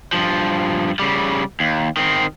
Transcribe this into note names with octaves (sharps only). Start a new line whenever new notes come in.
G2 F3
C#3 G3
D#2
D#3 C4